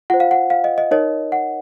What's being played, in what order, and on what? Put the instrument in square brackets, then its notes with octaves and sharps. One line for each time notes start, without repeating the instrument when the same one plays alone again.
[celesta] F4 C5 F#5
F5
F#5
F5
D#5
D#5
D#4 A#4 C#5 D#5
F#5